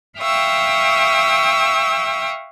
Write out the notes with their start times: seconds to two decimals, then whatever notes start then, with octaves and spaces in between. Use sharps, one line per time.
0.18 E5 F5 G5 C#6 D#6 E6